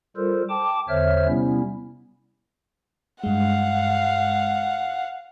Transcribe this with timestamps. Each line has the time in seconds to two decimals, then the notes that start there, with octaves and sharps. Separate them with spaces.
0.16 G3 F4 A4 A#4 C5
0.49 G5 A5 D6
0.89 E2 D3 C5 C#5 E5 F6
1.27 C3 G3 B3 C#4 E4
3.23 G2 G#3 F5 F#5